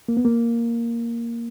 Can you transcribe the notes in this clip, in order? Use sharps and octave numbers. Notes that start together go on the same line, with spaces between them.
A#3
B3
A#3